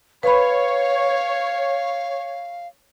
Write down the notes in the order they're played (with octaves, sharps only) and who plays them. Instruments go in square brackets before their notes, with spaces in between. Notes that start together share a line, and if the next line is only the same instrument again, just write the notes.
[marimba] B4 B5 [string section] C#5 [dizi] F5